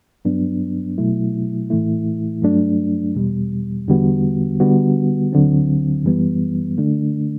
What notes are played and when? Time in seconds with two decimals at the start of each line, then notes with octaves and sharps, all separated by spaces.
0.25 G2 F#3 B3 D4
0.98 B2 F#3 A3 E4
1.70 A2 E3 A3 E4
2.42 G2 F#3 A3 D4
3.15 E2 B2 G3
3.88 E2 D3 G3 B3 F#4
4.60 D3 G3 B3 F#4
5.33 D2 D3 F#3 C4
6.05 F#2 E3 G3 B3
6.78 D3 A3 D4